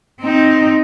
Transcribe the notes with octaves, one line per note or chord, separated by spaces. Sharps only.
C4 D#4